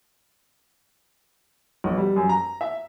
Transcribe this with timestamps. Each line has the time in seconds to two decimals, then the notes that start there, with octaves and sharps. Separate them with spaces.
1.84 B1
1.98 G3
2.16 F#2
2.29 A#5
2.61 E5